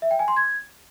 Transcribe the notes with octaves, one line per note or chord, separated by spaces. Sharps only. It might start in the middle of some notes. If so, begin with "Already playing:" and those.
E5
G5
G#5
C6
G#6